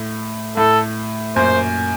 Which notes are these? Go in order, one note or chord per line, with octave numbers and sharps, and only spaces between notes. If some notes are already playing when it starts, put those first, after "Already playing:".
Already playing: A2
A2 A4
F#2 A#2 C5